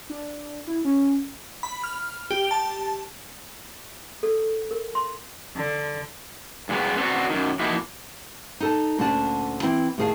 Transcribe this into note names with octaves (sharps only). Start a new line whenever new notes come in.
D4
E4
C#4
B5
F6
G4
A5
A4
A#4
C6
D3
G2 G#3 B3
B3 C4 D4 F#4
F#2 D#3
E3 F3 A#3 D#4 E4 F#4
D#4 A4 A5
D2 A#2 D3 C#4 D4 A5
E3 C4 E4
A2 D#3 G#4 F5 A5